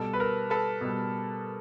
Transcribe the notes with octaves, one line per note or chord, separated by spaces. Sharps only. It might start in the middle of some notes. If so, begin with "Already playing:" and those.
Already playing: B2 G3 A4
B4
A#4
A4 B4
B2 G3